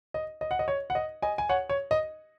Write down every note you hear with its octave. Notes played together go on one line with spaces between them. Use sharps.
D#5
D#5
F#5
D#5
C#5
F#5
D#5
D#5 G#5
G#5
C#5 F#5
C#5
D#5